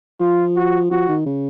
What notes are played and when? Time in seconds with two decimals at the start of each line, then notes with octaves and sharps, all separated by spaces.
0.20 F3 F4
0.56 F#4
0.91 F3 F#4
1.08 D#3
1.26 C#3